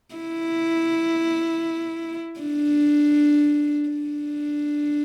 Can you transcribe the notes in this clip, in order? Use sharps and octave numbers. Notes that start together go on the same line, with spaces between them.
E4
D4
D4